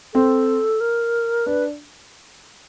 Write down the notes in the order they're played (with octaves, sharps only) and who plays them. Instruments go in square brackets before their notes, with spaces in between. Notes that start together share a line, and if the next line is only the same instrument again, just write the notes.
[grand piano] C4 [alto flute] A4
[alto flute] A#4
[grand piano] D4 [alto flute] B4